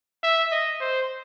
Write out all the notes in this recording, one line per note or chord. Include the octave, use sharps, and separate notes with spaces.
E5
D#5
C5